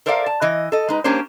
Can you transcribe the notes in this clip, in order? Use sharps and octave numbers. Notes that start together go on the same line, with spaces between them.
A4 A#4 C5 D5 E5 F5
A5
E3 D#5
A4 D#5
G#3 D#4 B4
G3 A#3 C#4 D4 C5